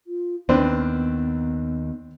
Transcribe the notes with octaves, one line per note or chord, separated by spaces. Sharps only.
F4
D#2 B3 C4 D4 B4